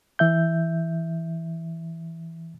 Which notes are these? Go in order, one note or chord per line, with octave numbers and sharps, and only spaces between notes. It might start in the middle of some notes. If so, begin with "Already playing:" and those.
E3 E5 G6